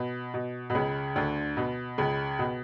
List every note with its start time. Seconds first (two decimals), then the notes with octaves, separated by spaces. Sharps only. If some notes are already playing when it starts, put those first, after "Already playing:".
Already playing: B2
0.34 B2
0.70 B2
0.75 C#2 C#3
1.15 D2 D3
1.57 B2
1.98 C#2 C#3
2.39 B2